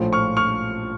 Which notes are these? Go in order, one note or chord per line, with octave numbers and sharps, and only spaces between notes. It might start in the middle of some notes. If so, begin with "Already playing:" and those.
Already playing: A#1 A2 F3
C#6 F6
C#6 F6